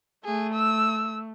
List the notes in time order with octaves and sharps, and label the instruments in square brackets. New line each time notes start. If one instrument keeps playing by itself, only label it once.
[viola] A3 [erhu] G#4
[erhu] E6